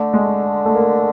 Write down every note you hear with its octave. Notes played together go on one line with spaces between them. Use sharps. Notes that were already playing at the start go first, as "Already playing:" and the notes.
Already playing: D3 A3
G#3
A3
A#3